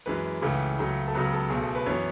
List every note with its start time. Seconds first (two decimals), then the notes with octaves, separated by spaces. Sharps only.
0.06 F#2 E3 G#3 B4
0.42 C#2 C#3 E3 A3
0.79 C#2 C#3 F#3 A3
1.08 A4
1.15 C#2 C#3 F#3 B3 B4
1.33 A4
1.50 B1 B2 A3 G#4
1.62 A4
1.75 B4
1.86 F#2 E3 B3 C#5